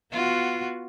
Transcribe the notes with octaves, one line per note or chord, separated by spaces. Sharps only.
B3 F4 F#4